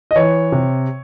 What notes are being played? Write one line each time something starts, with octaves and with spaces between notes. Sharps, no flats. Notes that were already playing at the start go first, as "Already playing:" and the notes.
D#5
E3 C#5
C3